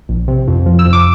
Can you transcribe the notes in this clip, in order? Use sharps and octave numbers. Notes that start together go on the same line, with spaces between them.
A#1
C3
F2
F3
E6
F2
D6